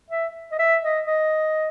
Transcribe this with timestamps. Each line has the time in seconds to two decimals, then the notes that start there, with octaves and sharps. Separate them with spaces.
0.10 E5
0.52 D#5
0.59 E5
0.83 D#5
1.07 D#5